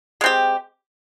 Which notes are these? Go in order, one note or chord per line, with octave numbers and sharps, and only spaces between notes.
G#3 C4 G4